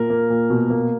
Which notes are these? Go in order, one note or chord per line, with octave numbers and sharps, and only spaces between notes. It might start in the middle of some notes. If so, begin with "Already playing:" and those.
Already playing: A#2 A#4
A#3
A#2
B2
A#3